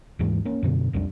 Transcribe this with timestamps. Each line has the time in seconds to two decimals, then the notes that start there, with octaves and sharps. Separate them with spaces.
0.19 D#2 G#2 E3 G#3
0.45 A#3 C#4
0.63 F#2 B2 D3
0.93 B1 F2 G3 D4